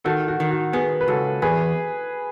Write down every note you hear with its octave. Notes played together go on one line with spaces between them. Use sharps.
D#3 F#4 A4
F#4
D#3
F#4
B3 G#4
B4
C#2 F#4 A4
E2 G#4 B4